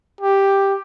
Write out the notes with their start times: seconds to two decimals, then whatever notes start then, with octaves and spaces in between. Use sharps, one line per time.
0.21 G4